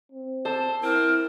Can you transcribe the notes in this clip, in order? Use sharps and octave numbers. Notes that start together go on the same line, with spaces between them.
C4
C5 A5 E6
C4 E4 A#4